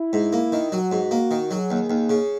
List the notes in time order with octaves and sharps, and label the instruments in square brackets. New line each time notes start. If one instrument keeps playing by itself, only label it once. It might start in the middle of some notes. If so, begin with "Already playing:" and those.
Already playing: [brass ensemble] E4
[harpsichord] G#2
A#3
D#3
[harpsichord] F#3 [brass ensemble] F#4
[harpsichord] G#2
A#3
D#3
[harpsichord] F#3 [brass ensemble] G#4
[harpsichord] D#2
D#2
C#3